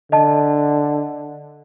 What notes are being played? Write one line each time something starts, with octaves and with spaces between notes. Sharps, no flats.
D3 D#5 A5